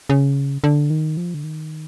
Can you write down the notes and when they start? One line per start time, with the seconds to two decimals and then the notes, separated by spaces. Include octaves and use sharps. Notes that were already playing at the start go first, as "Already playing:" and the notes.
0.09 C#3
0.64 D3
0.90 D#3
1.17 F3
1.34 D3
1.44 D#3